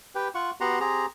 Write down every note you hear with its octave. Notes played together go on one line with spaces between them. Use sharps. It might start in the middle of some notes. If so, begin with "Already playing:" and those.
G4 B4 G5
F4 F#5 C#6
B3 F#4 G4 F#5 A#5 C6
C4 G4 G#4 A#5